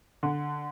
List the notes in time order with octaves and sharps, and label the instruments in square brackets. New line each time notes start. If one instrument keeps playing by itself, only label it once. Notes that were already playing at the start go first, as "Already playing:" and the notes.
[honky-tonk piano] D3